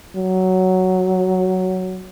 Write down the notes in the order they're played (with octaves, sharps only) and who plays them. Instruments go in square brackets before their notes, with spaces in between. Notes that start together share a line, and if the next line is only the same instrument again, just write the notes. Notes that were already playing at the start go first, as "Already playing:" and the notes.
[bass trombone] F#3